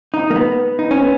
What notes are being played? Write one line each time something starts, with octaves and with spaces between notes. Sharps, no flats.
D#4
A#3
B3
D#4
C#4
B3